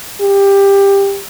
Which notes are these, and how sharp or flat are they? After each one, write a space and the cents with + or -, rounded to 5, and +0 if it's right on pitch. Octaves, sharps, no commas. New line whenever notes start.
G4 +15